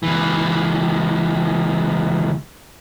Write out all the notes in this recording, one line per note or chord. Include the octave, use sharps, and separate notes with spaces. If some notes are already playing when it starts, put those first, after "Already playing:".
C#2 E3